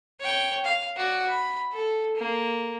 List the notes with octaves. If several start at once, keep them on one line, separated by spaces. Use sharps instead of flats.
C#5 G5
F5
F#4 D5
B5
A4
A#3